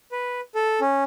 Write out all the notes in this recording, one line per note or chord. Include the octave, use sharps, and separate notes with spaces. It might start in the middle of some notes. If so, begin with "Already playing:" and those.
B4
A4
C#4